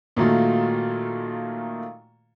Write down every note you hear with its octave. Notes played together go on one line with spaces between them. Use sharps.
A#2 D#3 F#3 A3 F4